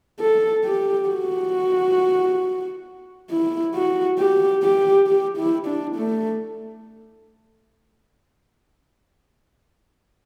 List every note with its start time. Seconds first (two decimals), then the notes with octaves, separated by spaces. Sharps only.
0.20 A4
0.65 G4
1.09 F#4
3.31 E4
3.74 F#4
4.19 G4
4.63 G4
5.07 G4
5.38 E4
5.67 D4
5.96 A3